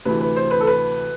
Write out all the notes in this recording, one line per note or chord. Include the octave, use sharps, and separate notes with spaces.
D2 C3 E3 B4
B4
C5
B4
A4
B4